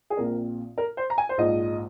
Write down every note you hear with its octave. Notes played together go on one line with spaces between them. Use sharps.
G#4
A#1 A#2 F3 C4 A#4
A#4
C5
A#5
G#5
C5
A#1 G#2 F3 D#5